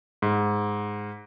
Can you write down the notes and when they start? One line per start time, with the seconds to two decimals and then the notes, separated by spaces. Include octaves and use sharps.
0.22 G#2